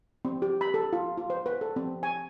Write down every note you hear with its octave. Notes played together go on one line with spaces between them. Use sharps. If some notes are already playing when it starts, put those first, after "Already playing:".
C4
G4
B5
A4
F4
F4
C5
B4
A4
C4
G#5